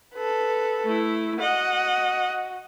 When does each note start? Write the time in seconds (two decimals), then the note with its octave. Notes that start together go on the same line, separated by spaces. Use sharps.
0.15 A4 B4
0.85 A3 E4
1.40 F#4 D#5 F#5